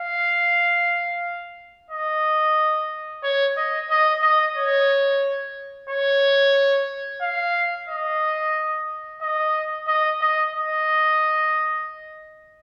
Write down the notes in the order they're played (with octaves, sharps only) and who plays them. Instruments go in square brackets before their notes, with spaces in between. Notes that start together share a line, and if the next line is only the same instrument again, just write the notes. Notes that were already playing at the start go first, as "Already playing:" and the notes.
Already playing: [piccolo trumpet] F5
D#5
C#5
D#5
D#5
D#5
C#5
C#5
F5
D#5
D#5
D#5
D#5
D#5